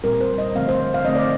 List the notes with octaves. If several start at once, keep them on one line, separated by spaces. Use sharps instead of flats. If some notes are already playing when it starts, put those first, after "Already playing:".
A#2 G3 C4 A#4
C5
D#5
D3 F3 A3 C4 F5
C5
F5
D3 A3 C4 D#5
D5